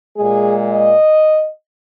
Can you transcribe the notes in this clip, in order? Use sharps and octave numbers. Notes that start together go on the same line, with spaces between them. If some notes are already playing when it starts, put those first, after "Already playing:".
A#2 G#3 G#4
D#5